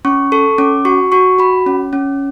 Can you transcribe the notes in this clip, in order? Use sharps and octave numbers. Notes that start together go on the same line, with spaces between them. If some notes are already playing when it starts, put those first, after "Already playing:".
C#4 C#6
A4 C#6
C#4 D6
F#4 C#6
F#4 C#6
F#4 B5
C#4
C#4